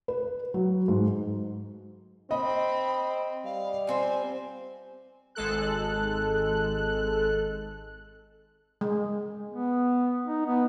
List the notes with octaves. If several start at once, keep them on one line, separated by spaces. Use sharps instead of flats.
B4
F#3
G#2
C4 D#5 B5
G3 F5
F3 C4 C5 G#5
G#1 G#3 A4 F#6
G#3
B3
D#4
B3